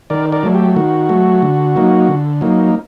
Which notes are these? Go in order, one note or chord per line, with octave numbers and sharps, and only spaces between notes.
D#3 A#4 D5
A#4 D5
F#3 A3
G4
D#3 F#4
F#3 A3
D3
F#3 A#3 D#4
D3
F#3 A#3 D#4